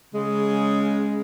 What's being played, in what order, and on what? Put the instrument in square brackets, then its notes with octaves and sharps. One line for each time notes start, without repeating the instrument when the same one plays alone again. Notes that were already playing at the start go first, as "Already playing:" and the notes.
[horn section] C#3 G#3